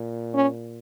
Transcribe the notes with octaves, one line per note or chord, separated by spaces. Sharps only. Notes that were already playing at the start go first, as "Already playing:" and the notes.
Already playing: A#2
C#4